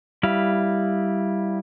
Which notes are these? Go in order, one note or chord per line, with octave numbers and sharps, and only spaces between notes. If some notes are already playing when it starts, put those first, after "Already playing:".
G3 E4 F5